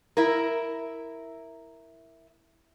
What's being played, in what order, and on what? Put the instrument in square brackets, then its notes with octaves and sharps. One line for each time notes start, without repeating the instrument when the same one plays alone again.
[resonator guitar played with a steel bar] E4 A#4